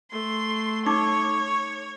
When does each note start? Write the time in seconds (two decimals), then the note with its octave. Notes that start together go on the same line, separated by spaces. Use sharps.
0.12 A3 C6
0.86 D#4 C#5 C#6 D6